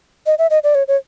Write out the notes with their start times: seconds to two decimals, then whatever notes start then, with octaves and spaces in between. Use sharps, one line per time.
0.26 D#5
0.38 E5
0.50 D#5
0.64 D5
0.75 C#5
0.88 C#5